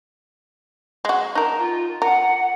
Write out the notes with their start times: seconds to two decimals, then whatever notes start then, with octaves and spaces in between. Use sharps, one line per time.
1.05 G#3 F#4
1.35 D#4 A#4 A5
1.58 F4
2.02 A#4 F#5